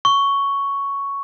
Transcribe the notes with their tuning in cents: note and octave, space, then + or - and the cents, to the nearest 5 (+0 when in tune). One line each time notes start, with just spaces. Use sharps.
C#6 +5